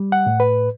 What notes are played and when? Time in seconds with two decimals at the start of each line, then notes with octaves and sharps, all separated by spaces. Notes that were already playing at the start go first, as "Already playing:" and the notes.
Already playing: G3
0.12 F#5
0.26 A2
0.40 B4